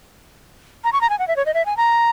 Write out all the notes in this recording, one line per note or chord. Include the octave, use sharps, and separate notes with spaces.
A#5
C#6
A#5
G#5
F#5
E5
C#5
D#5
E5
G#5
A#5